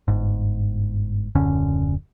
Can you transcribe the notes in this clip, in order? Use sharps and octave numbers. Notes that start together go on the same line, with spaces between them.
G1 G#2
D#1 F#2 D3 C#4